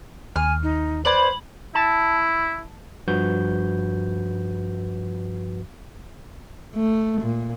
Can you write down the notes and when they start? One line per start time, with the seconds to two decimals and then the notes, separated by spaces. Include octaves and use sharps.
0.36 D#2 G#5 F6
0.63 D#4
1.05 B4 C5 D5 B5 F#7
1.75 E4 A5
3.08 G2 F3 F#4 B4 G6
6.75 A3
7.22 A#2